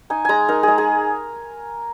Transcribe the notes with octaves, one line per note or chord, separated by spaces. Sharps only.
D#4 G#5
G#3 G#5 A#5
D#4 A#4
G#3 G#4
G#4